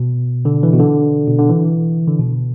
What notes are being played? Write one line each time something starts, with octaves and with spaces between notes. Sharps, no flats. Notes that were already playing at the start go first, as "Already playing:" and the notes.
Already playing: B2
D3
E3
B2
D3
B2
D3
E3
D3
B2